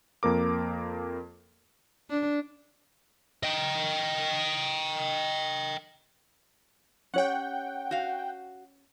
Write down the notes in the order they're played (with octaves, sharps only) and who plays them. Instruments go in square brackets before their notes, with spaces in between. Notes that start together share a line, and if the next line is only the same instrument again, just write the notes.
[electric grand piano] F2 A#3 A#4 D6
[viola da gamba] D4
[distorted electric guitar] D#5 G5
[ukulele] C#4 G4 C#5 [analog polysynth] F#5 G5
[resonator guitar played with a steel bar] F#4 F5